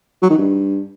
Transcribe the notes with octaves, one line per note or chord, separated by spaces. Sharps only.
F#3
D#3
G2